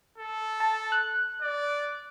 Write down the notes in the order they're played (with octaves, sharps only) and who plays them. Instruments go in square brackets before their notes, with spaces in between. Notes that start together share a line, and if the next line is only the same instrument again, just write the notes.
[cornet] A4
[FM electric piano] A5
F#6
[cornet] D5